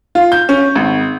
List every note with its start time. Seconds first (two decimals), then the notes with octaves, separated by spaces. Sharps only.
0.15 F4
0.32 G6
0.49 C#4
0.76 G#1